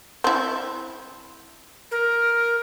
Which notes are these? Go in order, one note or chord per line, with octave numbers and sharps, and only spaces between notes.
C4 E4
A#4